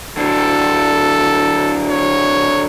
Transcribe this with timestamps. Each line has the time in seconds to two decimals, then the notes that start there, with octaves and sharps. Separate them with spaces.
0.17 D3 F#3 A4
1.90 C#5